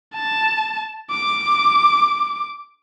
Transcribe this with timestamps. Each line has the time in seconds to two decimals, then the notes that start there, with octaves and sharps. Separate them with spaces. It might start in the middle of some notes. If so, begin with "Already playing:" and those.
0.15 A5
1.11 D6